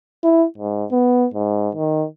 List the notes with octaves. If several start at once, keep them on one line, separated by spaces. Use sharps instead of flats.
E4
G#2
B3
G#2
D#3